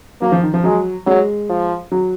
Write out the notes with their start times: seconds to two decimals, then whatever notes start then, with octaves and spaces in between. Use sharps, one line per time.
0.22 F#3 A#3
0.32 F3
0.43 D#3
0.54 F3
0.64 F#3 G#3
1.06 F#3 G#3
1.49 F3
1.91 F#3